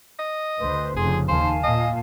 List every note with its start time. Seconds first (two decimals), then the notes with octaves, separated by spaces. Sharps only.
0.19 D#5
0.59 D2 B4 C5 C6
0.96 F1 F2 C#3 G#4 C6
1.28 D#2 D#3 C5 F5 G#5 A5
1.63 A#2 D#5